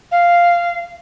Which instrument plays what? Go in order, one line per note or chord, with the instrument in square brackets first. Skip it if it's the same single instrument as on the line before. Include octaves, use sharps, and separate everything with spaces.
[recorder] F5